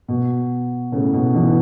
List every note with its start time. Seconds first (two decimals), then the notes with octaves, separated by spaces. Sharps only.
0.08 B2
0.92 A2 C#3
1.13 B2
1.34 B2 E3